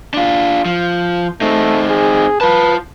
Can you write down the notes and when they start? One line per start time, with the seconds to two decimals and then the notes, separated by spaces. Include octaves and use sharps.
0.14 D4 F4
0.65 F3
1.41 A3 C4 D#4
1.90 G#4
2.41 F4 B4 A5